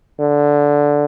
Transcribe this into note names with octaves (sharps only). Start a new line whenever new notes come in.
D3